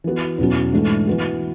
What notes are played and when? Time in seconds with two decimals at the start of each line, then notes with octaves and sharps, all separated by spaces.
0.04 E3 B3 F#4
0.38 E2 B2 F#3 C#4
0.73 G#2 E3 A3 D4
1.07 E3 B3 F#4